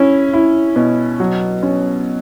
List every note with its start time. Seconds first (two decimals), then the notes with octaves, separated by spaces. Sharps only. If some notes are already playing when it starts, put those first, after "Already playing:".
Already playing: C#4 E4
0.33 E4
0.76 B2
1.20 F#3
1.63 C#4